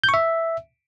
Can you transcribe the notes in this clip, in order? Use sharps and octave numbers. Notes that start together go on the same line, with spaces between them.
G6
C#6
E5